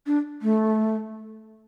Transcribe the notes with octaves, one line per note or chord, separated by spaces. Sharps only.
D4
A3